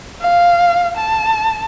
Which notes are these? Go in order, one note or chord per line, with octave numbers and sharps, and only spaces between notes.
F5
A5